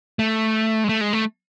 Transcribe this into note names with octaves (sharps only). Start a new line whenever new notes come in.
A3
G#3
A3
G#3
A3